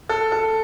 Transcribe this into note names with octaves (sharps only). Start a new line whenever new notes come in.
A4
A4